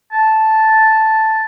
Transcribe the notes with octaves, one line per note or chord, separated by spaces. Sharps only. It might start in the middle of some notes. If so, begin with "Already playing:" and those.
A5